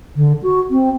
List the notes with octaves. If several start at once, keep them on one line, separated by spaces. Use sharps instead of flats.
D3
F#4
C4